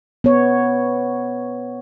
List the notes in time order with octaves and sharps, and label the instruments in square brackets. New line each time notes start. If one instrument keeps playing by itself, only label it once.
[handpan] B3 C#5